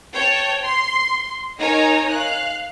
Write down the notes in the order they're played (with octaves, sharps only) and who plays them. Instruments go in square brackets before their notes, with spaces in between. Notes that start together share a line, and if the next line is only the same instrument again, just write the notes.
[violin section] C#5 G5 A5
C6
D#4 A#4 C#5 D#5 G#5 A#5
F5 F#6